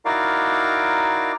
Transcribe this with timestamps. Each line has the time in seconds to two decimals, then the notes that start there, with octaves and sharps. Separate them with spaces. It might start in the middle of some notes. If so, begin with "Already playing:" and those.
0.05 D#4 E4 F#4 A#4 D5 F5